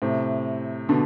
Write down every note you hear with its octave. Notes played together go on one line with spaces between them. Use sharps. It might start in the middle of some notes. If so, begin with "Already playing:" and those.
A2 C3
B2 D3